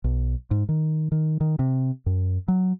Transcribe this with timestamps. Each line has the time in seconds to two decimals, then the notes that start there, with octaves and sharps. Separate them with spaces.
0.04 B1
0.51 G#2
0.69 D#3
1.12 D#3
1.41 D#3
1.59 C3
2.06 F#2
2.48 F#3